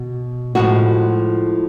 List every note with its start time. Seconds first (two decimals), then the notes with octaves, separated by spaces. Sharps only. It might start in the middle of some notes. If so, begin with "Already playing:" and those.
Already playing: B2
0.55 A2 F3 G#3 F#4